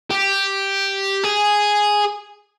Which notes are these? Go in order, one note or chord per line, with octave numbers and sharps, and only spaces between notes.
G4
G#4